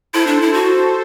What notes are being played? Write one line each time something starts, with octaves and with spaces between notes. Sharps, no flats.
E4 A4 C5
D4
E4
F#4